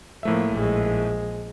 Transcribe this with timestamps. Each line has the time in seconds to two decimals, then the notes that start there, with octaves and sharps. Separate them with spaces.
0.23 A2 F3 A3 A#3 E5
0.52 A#1 G#3